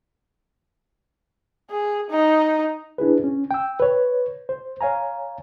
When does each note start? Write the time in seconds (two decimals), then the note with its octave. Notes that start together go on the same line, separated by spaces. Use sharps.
1.70 G#4
2.10 D#4
2.98 D4 E4 G#4 B4
3.24 C#4
3.51 G5 E6
3.80 B4 C#5
4.49 C5
4.81 C#5 F5 G#5 A#5